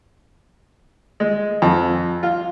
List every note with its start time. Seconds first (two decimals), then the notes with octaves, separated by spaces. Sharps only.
1.20 G#3
1.62 F2
2.23 F4